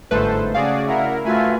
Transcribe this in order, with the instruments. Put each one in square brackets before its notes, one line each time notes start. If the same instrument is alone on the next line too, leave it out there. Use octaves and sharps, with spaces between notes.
[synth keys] G1 A3 B4 [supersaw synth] G#2 A4 C5
[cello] C#3 A3 [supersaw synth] F#4 G#4 D5 [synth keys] F5
[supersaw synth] E4 A#4 [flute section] D5 E5 F#5
[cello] A3 [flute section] F4 F#4 E5 [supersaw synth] B4 G#5